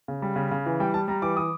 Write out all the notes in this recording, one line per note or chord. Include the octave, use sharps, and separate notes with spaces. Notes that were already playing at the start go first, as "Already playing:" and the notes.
C#3
G3
C#3
C#3
E3
G3 G5
G3 A5
G3 A#5
E3 D6
E3 D#6